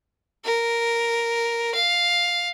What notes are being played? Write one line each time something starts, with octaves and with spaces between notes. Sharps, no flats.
A#4
F5